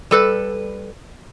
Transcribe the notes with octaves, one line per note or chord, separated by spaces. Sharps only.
G3 A4 B4